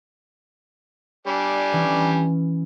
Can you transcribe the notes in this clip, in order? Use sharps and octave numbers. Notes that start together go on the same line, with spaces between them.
G3 D4 G#5
E3 C#4